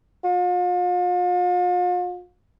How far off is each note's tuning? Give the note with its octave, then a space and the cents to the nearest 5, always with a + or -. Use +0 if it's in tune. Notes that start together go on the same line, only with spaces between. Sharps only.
F4 +40